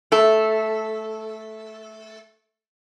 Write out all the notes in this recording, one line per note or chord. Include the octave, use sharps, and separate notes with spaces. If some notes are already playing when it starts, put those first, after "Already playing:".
A3 A4